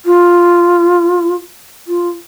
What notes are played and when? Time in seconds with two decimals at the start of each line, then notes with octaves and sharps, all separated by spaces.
0.06 F4
1.87 F4